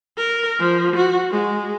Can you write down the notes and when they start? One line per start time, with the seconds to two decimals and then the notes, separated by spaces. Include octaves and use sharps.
0.18 A#4
0.59 F3
0.96 F#4
1.31 G#3